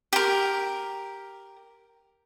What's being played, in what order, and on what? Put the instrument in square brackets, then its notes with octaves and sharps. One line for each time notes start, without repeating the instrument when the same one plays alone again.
[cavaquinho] G4 A#4